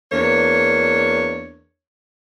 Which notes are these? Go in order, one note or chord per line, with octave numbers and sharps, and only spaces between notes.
E2 A#3 D4 C#5